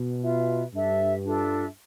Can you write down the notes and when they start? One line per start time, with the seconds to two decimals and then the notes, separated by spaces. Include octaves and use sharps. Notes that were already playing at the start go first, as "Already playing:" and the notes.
Already playing: B2
0.22 F4 B4 E5
0.73 G2 D4 A4 E5
1.23 D4 F4 A4 E5